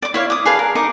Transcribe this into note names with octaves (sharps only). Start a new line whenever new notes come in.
D5 D6
E4 C#5 F5
D6 D#6
G#4 B4 F5 A5
A#4
D#4 A#4 D#5 D6